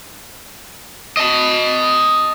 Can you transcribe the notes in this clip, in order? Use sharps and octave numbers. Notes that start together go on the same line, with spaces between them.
D#5 A5